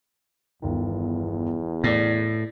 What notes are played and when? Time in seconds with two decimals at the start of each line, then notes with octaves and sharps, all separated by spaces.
0.62 G1 E2 D#3
1.84 A2 D5 A#6